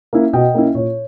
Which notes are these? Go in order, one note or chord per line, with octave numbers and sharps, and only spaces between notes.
A#3 C#4 E4
B2 D#5 G5
A#3 C#4 E4
A#2 C#5